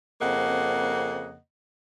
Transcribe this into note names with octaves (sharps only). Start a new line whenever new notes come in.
F2 C#3 A#3 C4 D#5 F#5